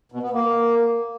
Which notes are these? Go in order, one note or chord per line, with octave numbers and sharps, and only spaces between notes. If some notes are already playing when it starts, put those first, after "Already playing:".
B2
B3
A#3